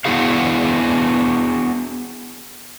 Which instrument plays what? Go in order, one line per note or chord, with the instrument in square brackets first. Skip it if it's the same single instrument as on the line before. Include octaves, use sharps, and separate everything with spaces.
[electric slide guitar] B3 D4 E4 F#4 G#4 F5